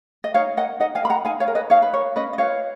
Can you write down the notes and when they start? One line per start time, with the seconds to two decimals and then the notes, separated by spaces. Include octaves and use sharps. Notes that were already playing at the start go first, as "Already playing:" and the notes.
0.24 D#5
0.34 D#4 C#5 F5
0.57 A#4 D#5 F#5
0.80 D#4 D#5 F#5
0.95 F5 G#5
1.03 A#4 B5
1.10 F#5 A#5
1.25 D#4 F5 G#5
1.40 C#5 F5
1.48 A#4
1.55 B4 D#5
1.70 D#4 C#5 F5
1.82 B4
1.93 A#4 C#5
2.16 C#4 B4 D#5
2.33 D#5
2.38 F4 B4 C#5 F5